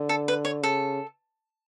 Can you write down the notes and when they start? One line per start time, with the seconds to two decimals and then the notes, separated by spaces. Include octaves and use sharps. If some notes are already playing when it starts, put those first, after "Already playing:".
Already playing: D3
0.09 A4
0.28 B4
0.45 C#5
0.63 C#3 A4